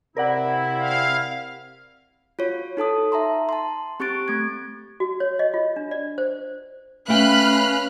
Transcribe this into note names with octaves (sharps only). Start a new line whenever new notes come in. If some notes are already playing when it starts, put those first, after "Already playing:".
C3 C4 E4 A#4 D5 F#5
F5
F4 F#4 C#5
D#4 A4 A5 D#6
E5 A5 A#5 C6
A5 C6
C4 G4 C#6 F#6 A6 D7
A3 G#6
F#4
C#5
D#5
F4
D4
D5
C5
A3 C#4 B4 F5 G5 B5 F6 F#6